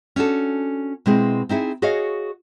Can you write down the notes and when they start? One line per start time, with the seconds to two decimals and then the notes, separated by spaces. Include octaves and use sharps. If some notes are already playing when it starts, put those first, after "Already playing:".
0.16 C#4 D4 F#4 A4
1.06 B2 G#3 C4 E4 G#4
1.49 C4 D#4 E4 G#4
1.82 F#4 G#4 C#5 D#5 F5